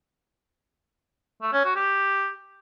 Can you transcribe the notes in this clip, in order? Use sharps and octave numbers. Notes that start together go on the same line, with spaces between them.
A3
C#4
F#4
G4